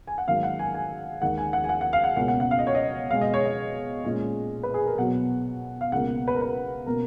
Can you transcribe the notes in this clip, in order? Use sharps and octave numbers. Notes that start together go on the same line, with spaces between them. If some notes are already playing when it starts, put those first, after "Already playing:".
G#5
F#5
G#2 D#3 F#3 A#3 F5
F#5
G#5
G#5
D#2 D#3 G#3 F#5
G#5
F#5
G#5
F#5
F#5
F5
F#5
C#2 B2 A#3 C#4 F#5
F#5
F#5
F5
D#5
C#5
D#5
B2 G#3 B3 F5
D#5
C#5
D#5
A#2 G#3 C#4
B4
G#4
A#4
B2 F#3 B3 F#5
F5
C#2 B2 A#3 F#5
B4
A#4
B4
B2 A#3 C#4 A#4